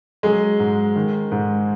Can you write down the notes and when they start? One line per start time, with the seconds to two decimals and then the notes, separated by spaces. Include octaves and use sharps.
0.23 F#3 G#3 G#4
0.60 G#2
0.96 D#3
1.32 G#2